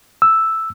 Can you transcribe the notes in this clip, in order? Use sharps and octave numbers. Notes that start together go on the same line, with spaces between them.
E6